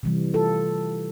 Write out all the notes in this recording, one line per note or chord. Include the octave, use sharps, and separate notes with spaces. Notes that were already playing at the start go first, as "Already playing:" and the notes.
C3 E3 G3
F4 A4